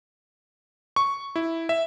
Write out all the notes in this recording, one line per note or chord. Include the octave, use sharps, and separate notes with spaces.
C#6
E4
E5